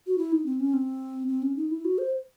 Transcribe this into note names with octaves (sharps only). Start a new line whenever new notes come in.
F#4
E4
D#4
C4
C#4
C4
C4
C#4
D#4
E4
F#4
C5